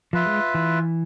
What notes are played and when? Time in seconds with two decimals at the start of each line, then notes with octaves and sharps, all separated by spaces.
0.13 F3 F4 B4 E5
0.26 G#3
0.55 E3